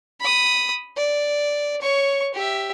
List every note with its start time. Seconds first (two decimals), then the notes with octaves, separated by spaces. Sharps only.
0.20 B5 D#6
0.97 D5
1.82 C#5 C#6
2.34 G4 E5